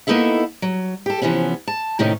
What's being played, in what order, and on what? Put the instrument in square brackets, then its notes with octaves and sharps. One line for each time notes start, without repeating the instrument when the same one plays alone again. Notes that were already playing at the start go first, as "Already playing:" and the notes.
[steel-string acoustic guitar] A#3 B3 D#4 E4 A4 E5
F#3
G4 A4
C3 E3 F3 B3 C#4
A5
A2 C3 D#3 A3 C#4 D#4